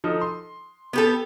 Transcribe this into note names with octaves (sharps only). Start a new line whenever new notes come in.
F3 D#4 A4
C6
B3 G4 A4